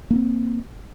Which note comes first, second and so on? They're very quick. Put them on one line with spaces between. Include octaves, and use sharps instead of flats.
A#3 D4 C4